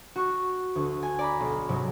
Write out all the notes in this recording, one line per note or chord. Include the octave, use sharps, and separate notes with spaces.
F#4 C#6
D2
G#5
D5 A#5 B5
B1
G#2 C3 F#3